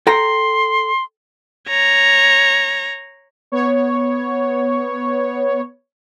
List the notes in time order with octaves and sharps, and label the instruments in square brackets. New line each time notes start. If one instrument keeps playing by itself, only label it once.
[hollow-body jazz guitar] A4 G5 A#5 [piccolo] C6
[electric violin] C#5 A#5
[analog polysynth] B3 C#5